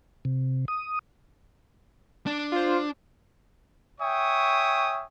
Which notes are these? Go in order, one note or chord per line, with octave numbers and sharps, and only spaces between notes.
C3
D#6
D4
F4 C5
C#5 E5 G5 G#5 C#6 D#6